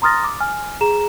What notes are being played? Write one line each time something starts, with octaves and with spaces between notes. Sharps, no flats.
A#5 C6 D#6 F6 A6 A#6
D6
G#5 F6
G#4 A#5 E7